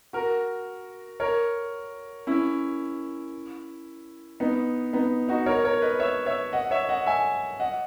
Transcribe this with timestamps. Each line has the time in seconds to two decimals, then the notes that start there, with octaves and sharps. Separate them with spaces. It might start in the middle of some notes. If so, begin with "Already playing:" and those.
0.13 F#4 A#4
1.20 A#4 C#5
2.27 C#4 E4
4.40 B3 D#4
4.93 B3 D#4
5.28 D#4 F#4
5.46 A#4 C#5
5.64 A#4 C#5
5.82 B4 D#5
6.00 C#5 E5
6.26 C#5 E5
6.53 D#5 F#5
6.71 C#5 E5
6.89 D#5 F#5
7.06 E5 G#5
7.60 D#5 F#5